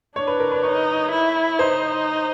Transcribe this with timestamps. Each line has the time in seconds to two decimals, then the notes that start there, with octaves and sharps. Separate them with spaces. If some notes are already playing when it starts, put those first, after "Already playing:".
0.16 D4 C#5
0.27 B4
0.40 A#4
0.51 B4
0.63 D#4 C#5
1.11 E4
1.59 D#4 C5